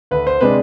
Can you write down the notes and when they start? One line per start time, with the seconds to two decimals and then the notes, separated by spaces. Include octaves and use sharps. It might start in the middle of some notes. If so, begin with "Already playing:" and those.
0.11 D2 B4
0.27 C5
0.41 C3 G#3 D4 B4